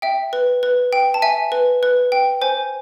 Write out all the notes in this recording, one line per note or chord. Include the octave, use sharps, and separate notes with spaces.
E5 G5
B4
B4
G5
A5
E5 G#5
B4
B4
G5
C5 G#5